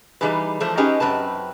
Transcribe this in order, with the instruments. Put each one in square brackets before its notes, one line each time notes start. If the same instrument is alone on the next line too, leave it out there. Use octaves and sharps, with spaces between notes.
[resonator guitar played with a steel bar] E3 G3 D#4 G#4 B4
E3 F3 A3 A4 C5
C#4 D#4 G4 G#4 B4 D#5
F#2 C4 B4 A5